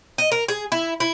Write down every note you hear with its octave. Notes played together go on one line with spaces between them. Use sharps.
D#5
A#4
G#4
E4
E4